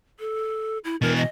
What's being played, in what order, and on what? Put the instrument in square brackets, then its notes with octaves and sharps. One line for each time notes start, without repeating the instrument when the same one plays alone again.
[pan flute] A4
E4
[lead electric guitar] B2 E3 [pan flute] A#4
[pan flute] D#5